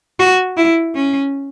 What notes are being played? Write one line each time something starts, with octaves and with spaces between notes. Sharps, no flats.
F#4
E4
C#4